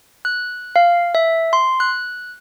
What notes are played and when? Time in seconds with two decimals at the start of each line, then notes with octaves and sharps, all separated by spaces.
0.25 F#6
0.76 F5
1.15 E5
1.53 C6
1.80 F#6